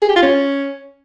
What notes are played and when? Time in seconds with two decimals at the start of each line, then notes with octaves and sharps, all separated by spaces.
0.02 G#4
0.09 G4
0.16 F4
0.22 C#4